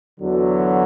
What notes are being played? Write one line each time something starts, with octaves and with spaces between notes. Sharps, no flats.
E2 D3 F#3